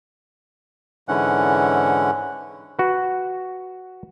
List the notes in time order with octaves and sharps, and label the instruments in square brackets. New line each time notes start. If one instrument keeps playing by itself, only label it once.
[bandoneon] G#2 D3 E3 C#4 F#5
[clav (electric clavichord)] F#4 B4